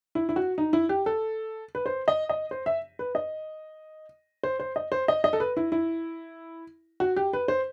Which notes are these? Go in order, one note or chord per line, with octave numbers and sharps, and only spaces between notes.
E4
E4
F#4
D#4
E4
G4
A4
B4
C5
D#5
D#5
C5
E5
B4
D#5
C5
C5
D#5
C5
D#5
D#5
A4
B4
E4
E4
F#4
G4
B4
C5